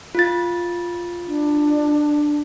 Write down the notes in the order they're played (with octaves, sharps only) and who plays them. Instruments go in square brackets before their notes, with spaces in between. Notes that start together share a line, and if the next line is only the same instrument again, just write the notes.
[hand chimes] F4 A6
[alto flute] D4